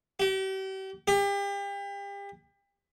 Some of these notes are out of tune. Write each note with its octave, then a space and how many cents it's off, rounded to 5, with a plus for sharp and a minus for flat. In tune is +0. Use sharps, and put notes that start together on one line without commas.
G4 -40
G4 +35